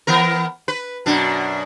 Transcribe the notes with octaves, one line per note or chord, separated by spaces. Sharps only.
E3 B3 A#4
B4
F#2 B2 D4